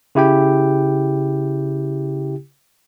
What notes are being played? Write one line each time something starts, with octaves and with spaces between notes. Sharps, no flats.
C#3 E4 G4 G5